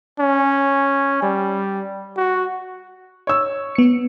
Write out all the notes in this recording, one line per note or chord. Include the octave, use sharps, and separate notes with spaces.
C#4
G3
F#4
C#5 E6
B3 C#7